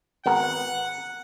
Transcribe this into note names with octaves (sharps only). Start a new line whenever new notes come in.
G#1 B3 A#4 F#5